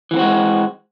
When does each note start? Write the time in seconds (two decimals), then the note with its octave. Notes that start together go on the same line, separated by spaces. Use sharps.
0.11 E3
0.14 B3
0.16 C4
0.19 F#4
0.22 G#3